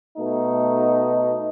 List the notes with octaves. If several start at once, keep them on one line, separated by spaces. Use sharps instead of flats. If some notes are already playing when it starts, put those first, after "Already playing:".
B2 A3 D#4